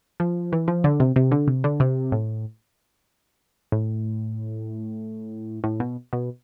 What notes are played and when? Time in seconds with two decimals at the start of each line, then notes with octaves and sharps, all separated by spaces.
0.20 F3
0.53 E3
0.68 F3
0.84 D3
1.00 C3
1.16 C3
1.31 D3
1.48 C3
1.64 D3
1.80 C3
2.12 A2
3.72 A2
5.64 A2
5.80 B2
6.13 B2